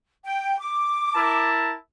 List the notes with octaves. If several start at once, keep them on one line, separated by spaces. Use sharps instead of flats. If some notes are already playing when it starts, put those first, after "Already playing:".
G5
D6
E4 A#4 A5